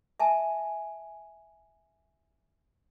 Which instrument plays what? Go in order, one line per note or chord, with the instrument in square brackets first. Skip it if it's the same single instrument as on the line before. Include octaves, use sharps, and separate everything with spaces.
[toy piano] E5 G#5 A5